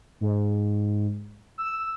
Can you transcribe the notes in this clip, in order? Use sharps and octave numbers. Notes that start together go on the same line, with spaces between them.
G#2
E6